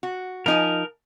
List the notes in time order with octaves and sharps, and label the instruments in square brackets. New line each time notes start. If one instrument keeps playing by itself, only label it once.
[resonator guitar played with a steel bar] F#4
[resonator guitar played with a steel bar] F3 D#4 G#5 [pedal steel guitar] A#4